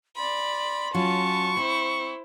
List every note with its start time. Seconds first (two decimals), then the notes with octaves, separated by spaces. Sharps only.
0.16 D5 B5 C6
0.94 F#3 C#4 F4 A5 C#6
1.57 C4 E4 C5